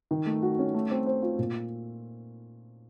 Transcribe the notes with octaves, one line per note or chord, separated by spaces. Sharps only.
D#3
A3
F#4
C#4
A3
C4
C5
F4
A#2